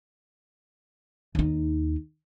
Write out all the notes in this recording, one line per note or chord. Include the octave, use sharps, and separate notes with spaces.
D#2 D#4